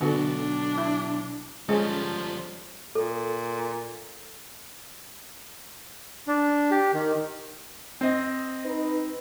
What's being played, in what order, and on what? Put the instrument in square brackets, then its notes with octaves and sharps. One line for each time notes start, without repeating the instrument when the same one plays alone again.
[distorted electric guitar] B1 [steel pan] D3 [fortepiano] B3 F#4 A4 [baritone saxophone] D4
[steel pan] E4
[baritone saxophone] F3 [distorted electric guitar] G3 A4 [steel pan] G#3 [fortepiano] C#4
[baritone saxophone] A#2 [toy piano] A4
[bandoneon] D4
G4
D#3
[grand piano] C4 D#5
[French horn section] D#4 B4